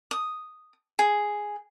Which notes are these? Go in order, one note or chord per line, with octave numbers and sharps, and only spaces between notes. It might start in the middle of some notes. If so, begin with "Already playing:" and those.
D#6
G#4